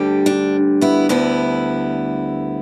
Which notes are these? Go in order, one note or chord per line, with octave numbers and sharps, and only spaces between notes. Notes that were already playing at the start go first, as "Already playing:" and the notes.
Already playing: D2 D3 G3 G4
D4
B3 E4
D2 D3 G3 B3 E4